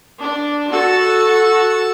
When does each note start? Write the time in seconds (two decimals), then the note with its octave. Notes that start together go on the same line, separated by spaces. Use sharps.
0.21 D4
0.72 F#4 A4 F#5 A5 E6